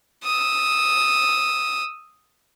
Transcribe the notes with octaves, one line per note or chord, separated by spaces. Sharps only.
D#6 E6